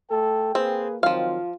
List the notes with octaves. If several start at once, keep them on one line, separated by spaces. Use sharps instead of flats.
A3 A4 G5
A#3 C4 G#4 B4
D#3 F3 F#3 C4 F4 F5